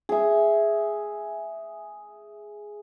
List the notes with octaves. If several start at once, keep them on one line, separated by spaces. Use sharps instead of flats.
G#4 E5